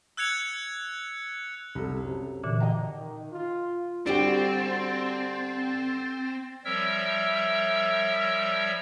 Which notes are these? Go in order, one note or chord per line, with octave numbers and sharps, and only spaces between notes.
E6 F#6 G#6 C#7 F7
C2 A4
F#2 C3
A#2 D3 E3
D#5 G5 A#5
D#3
F4
D3 G3 C4 D4 F#4 G4 A6
F3 G3 A#4 C#5 E5 E6